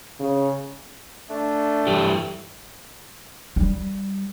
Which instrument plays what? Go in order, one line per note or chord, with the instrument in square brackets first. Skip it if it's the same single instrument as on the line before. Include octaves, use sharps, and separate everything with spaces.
[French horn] C#3
[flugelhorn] A3 [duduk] D4
[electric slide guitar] G2 E3 G4
[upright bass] G3